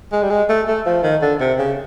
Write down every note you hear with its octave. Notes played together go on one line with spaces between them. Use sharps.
G#3
G3
G#3
A3
A3
F3
D#3
D3
C3
C#3